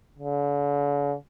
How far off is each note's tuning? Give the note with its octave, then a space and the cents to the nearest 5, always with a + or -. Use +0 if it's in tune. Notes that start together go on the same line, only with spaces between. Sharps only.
D3 -45